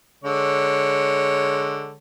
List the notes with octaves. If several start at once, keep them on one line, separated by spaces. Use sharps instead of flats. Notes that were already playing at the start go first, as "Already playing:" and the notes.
D3 G#3 C#5